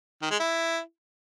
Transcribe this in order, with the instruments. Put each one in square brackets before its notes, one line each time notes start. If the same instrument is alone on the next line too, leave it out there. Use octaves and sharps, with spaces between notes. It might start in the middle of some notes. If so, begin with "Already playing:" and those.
[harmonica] D#3
G#3
E4